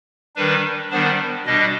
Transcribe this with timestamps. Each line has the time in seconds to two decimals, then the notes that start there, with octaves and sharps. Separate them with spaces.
0.36 D#3 G3 D4 B4
0.91 D#3 G3 B3 D4 C5
1.46 B2 G3 D4 D#5